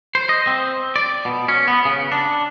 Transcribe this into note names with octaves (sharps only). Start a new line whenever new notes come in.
C5
D#5
C4
D5
B2
C#4
B3
C#3
D4